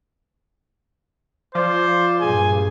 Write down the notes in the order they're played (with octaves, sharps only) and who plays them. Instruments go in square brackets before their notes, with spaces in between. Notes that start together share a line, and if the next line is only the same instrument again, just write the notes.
[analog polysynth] F3 [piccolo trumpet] C5 [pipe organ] D5 D6
[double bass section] G2 A#2 [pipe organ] G#4 [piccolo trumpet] G#5